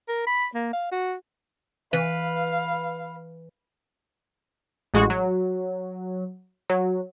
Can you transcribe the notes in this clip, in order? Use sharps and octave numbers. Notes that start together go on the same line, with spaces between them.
A#4
B5
A#3
F5
F#4
E3 B4 F5
A1 G#3 F#4
F#3
F#3